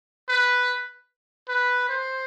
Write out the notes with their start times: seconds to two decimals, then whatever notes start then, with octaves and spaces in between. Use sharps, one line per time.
0.29 B4
1.49 B4
1.89 C5